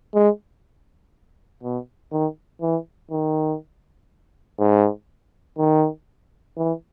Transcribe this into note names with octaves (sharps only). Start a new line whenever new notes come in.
G#3
B2
D#3
E3
D#3
G#2
D#3
E3